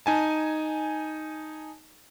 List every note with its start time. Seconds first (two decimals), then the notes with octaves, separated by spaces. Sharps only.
0.06 D#4 G#5 A5